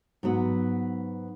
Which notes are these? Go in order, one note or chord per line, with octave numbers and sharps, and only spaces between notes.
G#2 F#3 B3